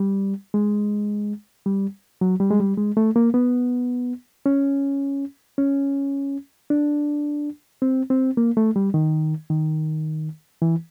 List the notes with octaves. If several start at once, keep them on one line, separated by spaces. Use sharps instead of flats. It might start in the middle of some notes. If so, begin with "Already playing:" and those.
Already playing: G3
G#3
G3
F#3
G3
G#3
G3
G#3
A3
A#3
B3
C#4
C#4
D4
C4
C4
A#3
A3
G3
D#3
D#3
E3